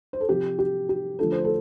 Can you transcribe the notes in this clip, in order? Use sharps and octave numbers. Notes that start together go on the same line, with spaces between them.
C5
A4
C3 F3 C4 F4 G4
G4
G4
D3 F3 A3 D4 F4 A4
C5
A4